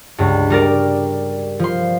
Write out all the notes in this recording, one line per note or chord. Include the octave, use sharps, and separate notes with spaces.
C#2 G2
G3 A#4 D5
F3 C6